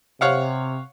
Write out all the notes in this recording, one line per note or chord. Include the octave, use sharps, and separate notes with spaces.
C3 C#5 F5 F#5